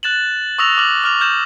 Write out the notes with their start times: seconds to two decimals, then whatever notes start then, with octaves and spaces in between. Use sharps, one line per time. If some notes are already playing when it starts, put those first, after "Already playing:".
0.03 F#6 A6 E7 F#7
0.58 C#6 D#6 E6 A#6 F7
0.78 D6 F6 F#7
1.04 D6 F6 F7
1.21 F6 G6 E7 F#7